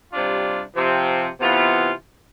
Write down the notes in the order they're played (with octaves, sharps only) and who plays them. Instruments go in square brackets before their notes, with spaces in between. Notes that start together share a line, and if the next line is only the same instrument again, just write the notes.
[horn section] C3 G3 D4 F4
C3 F3 C4
C3 E3 B3 F4